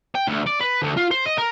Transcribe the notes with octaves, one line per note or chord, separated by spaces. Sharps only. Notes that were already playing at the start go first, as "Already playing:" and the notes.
G5
D2
D5
B4
D2
F4
C5
D#5
A#4